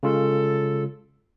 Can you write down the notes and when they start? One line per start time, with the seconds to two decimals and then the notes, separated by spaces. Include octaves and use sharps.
0.03 C#3 G#3 F4 A4